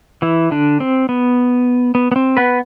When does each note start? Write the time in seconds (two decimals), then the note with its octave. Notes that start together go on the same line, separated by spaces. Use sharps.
0.22 E3 E4
0.51 D3 D4
0.80 C4
1.09 B3
1.95 B3
2.12 B3
2.16 C4
2.37 B3 B4